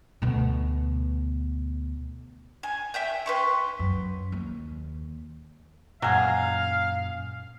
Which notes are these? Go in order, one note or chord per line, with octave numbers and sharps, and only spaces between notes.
D2 B2
G#5
E5 G5 G6
B4 C6 C#6
F#2
D#2
F#2 A#2 F#3 G#4 F5